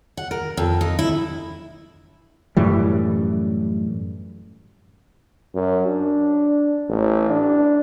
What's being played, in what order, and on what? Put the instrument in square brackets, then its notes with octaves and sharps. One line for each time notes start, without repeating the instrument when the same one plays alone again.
[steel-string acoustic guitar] F#5
A#4
F2
D#4
E4
[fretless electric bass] F#2 A2 E3 G3
[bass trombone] F#2
D4
A1
D4